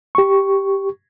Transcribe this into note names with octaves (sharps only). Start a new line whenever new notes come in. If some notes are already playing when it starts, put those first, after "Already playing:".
G4 C#6